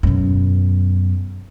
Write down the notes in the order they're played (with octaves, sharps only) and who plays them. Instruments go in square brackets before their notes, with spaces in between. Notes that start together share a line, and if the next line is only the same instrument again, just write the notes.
[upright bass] F#2 B2